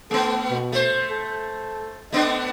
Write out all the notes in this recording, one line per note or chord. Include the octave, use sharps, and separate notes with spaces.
A3 B3 A4
B2
A3 C5
A4
A3 B3 D4 D#5